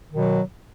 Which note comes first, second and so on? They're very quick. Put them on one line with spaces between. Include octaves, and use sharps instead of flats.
D#3 B2 F#3